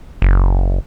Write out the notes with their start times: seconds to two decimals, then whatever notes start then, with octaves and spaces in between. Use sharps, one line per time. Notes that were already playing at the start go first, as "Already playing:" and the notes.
0.22 F#1